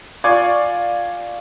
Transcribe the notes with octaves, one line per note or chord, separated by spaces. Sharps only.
F4 D5 G#5 C#6 D6